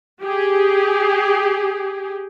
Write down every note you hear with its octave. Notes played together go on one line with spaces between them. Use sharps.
G4 G#4